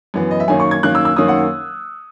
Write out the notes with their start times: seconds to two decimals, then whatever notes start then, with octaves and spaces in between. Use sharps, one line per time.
0.14 F#2 E3 B3
0.31 D#5
0.40 E5
0.48 F#2 D#3 A#3 C#4 G#5
0.60 C#6
0.71 G#6
0.83 F#2 D#3 A#3 C#4 F#6
0.95 E6
1.05 E6
1.16 F#2 D#3 A#3 C#4 D#6
1.28 F#5